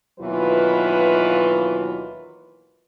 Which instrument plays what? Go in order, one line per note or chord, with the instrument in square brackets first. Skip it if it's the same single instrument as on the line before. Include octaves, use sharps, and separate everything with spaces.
[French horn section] D#2 B2 E3 F#3 F4 B4